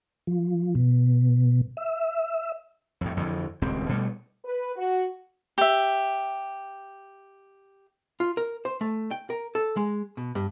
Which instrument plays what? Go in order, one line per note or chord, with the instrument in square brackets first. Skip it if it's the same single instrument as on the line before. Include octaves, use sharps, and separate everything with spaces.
[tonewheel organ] F3
B2
E5
[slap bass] F2 A2
F2 D3 E3
D#1 C#2 C4
B2 G3 A3
[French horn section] B4
F#4
[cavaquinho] G4 E5
[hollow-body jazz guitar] F4
A#4
C5
A3
G5
A#4
A4
G#3
B2
G2